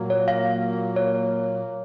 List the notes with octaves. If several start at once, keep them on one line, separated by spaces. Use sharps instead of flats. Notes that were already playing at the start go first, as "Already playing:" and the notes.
Already playing: A#2 F#3 A#3
C#5
F5
C#5